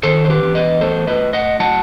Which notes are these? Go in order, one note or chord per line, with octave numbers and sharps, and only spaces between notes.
D#3 A4 C5
C5
G4 B4
E2
B4 D#5
A3 A4 C5
B4 D#5
A3
D#5 F#5
F#3 F#5 A5